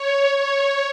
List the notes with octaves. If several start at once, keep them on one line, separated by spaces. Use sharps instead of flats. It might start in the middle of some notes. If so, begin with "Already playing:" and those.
Already playing: C#5
C#5